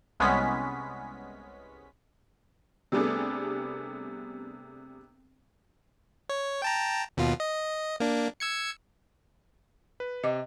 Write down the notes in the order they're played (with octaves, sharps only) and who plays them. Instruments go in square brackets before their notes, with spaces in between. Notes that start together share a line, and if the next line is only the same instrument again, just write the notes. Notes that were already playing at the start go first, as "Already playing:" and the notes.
[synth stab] C2 G#3 B3 C#4 B6
[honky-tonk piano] C3 G3 A3 B3 D4 G#4
[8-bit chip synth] C#5
G5 A5 A#5
D#2 B2 F4
D#5
A#3 D4
E6 G#6 C#7
[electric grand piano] B4
[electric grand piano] C3 [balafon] D#5 D6